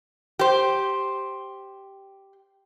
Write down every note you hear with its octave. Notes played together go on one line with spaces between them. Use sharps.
G4 C5